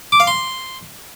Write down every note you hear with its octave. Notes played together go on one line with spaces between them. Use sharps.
D6
F5
C6